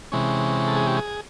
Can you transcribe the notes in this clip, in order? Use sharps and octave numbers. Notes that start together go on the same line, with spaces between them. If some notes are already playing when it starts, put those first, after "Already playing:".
C3 E3 G#3 C#4
A4
G#4
G4
G#4